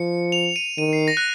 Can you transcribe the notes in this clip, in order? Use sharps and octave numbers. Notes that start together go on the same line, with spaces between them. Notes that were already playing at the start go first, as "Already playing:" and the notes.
Already playing: F3 C#7
F7
D#7
D#3 D#7
C7
A#6
F#6